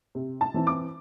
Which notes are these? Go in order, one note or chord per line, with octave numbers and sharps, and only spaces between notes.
C3
A5
E3 C4 E4
D6